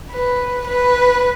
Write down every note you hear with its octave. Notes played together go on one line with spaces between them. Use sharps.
B4
B4